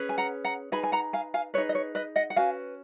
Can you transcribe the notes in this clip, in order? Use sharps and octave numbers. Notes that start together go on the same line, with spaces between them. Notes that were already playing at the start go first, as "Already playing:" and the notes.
Already playing: C#4 G#4 B4
G#5
F#5 A#5
F#5 A#5
D#4 G#4 B4 G#5 B5
G#5
F#5 A#5
F5 G#5
F5 G#5
D#4 G#4 B4 C#5
D#5
C#5
B4 D#5
D#5 F#5
F#5
C#4 F#4 B4 F5 G#5